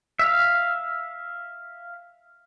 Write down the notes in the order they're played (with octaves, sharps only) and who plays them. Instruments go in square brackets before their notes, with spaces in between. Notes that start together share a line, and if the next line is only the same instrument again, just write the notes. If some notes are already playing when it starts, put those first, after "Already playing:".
[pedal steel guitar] E5 F5